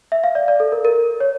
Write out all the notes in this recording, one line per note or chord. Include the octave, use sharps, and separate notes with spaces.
E5
F5
D5
D5
A4
A#4
A#4
C#5